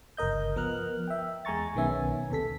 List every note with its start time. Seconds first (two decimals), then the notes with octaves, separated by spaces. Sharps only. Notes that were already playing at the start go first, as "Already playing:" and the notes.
0.17 G1 C#2 A#4 D#5 G6
0.56 F3 B3 A#4 F6 F#6
1.07 E5 G5
1.45 E2 G#3 G#5 A#5 C#6 A6
1.75 B1 D#3 B3 C#4 E5 G#5
2.30 D#2 C3 A4 B6